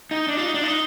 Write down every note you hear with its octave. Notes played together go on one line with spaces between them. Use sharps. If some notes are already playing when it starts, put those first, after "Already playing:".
D#4
D4
F4
D#4
D4
D#4